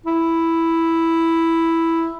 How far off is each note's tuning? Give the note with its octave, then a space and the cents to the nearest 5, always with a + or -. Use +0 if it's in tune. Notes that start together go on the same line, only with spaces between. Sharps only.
E4 +0